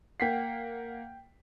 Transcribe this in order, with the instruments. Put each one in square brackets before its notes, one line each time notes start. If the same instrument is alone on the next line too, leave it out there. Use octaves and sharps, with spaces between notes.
[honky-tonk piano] A#3 F#5 [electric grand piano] G5 B6 C7